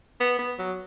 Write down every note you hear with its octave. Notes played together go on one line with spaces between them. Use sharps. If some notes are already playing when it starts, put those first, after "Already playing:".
B3
B3
F#3